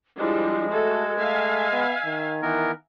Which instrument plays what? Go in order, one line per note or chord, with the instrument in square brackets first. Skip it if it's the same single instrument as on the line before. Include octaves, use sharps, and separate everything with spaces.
[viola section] F3 G3 D4 [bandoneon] G#3 [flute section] E4 G#4
[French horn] A3 [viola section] F#4 A4 [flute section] D#5 G#6
[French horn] A3 [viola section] E5 F5 G#5
[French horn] B3
D#3
[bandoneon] E3 B3 A#4